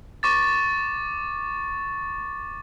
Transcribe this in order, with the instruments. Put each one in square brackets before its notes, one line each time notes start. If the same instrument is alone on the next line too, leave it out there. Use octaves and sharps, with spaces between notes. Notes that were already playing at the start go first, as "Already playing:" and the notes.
[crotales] C#6 D6 A6